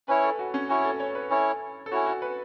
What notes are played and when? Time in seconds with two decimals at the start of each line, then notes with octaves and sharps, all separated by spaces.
0.08 C#4 E4 B4 C#5
0.24 A4
0.39 F#4
0.54 C#4
0.69 C#4 E4 F#4 C#5
0.85 A4
1.00 C#5
1.15 B4
1.30 C#4 E4 A4 C#5
1.86 A4
1.92 C#4 E4 F#4 C#5
2.06 F#4
2.22 B4